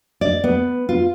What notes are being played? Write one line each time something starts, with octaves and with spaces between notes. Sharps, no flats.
D5
B3
F4